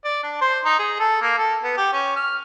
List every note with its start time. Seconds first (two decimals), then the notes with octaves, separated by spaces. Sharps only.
0.05 D5
0.23 D4
0.41 C5
0.65 D#4
0.79 G#4
0.99 A4
1.22 A#3
1.38 A4
1.63 B3
1.77 G4
1.93 C#4
2.16 F6